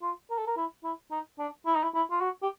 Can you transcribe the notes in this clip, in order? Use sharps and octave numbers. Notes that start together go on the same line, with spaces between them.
F4
A#4
A4
A#4
E4
E4
D#4
D4
E4
D#4
E4
E4
F4
F#4
G4